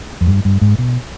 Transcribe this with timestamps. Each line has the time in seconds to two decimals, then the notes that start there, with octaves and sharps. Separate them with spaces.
0.21 F2
0.27 G2
0.45 G2
0.61 G#2
0.78 B2